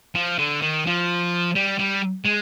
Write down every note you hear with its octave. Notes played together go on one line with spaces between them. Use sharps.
F3
D3
D#3
F3
G3
G3
G#3